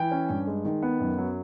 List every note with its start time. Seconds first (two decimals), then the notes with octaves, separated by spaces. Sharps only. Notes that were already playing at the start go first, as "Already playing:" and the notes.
Already playing: E3 G5
0.11 C#4
0.30 G2
0.47 G#3
0.65 D#3
0.83 B3
1.00 F#2
1.18 F#3